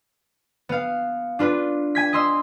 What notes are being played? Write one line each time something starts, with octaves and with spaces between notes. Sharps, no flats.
B3 F5
D4 F4 B4
G#5 G#6 B6
D#5 C6 E6